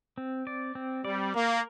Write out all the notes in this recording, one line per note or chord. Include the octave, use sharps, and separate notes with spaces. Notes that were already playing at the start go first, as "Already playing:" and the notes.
C4
D5
C4
G3 D5
A#3 A#4